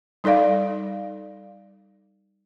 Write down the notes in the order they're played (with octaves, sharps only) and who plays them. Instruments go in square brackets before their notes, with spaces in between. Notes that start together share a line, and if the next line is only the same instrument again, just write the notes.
[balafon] G3 D#4 A4 D5 F5